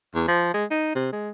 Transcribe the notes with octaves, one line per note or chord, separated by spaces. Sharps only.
E2
F3
G#3
D#4
C3
G#3